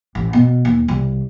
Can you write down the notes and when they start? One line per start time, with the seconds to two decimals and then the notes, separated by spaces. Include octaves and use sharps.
0.15 A1
0.33 B2
0.65 D#2
0.88 C2